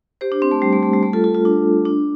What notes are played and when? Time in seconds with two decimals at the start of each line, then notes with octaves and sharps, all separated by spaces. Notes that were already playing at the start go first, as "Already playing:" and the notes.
0.21 G4 C5
0.32 D4
0.42 C4
0.51 A3
0.62 G3
0.73 A3
0.83 A3
0.93 G3
1.03 A3
1.13 F4 A4
1.24 F4 A4
1.35 F4
1.45 D4
1.85 D4